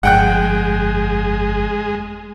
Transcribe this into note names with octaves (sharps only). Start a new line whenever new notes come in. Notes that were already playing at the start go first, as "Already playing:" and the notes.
G1 F2 G#3 F#5 G5 F#6